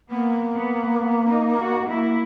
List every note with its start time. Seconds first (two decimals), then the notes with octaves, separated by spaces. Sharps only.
0.10 A#3 B3
0.56 B3
1.01 B3
1.30 D#4
1.60 F#4
1.89 A#3 E4